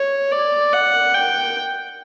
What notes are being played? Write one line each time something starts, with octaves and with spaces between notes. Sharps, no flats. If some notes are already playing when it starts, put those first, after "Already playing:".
Already playing: C#5
D5
F#5
G5